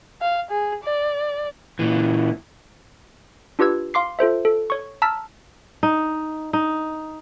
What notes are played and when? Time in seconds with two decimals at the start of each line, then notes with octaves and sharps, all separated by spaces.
0.21 F5
0.51 G#4
0.84 D5
1.79 A#2 E3
3.59 D4 F4 G4 B4 E6 G#6
3.94 F5 C6 D6 C7
4.19 F4 A4 C5 E5
4.45 A4
4.70 C#5 C#6
5.02 A5 A#5 E6 F6 B6
5.83 D#4
6.53 D#4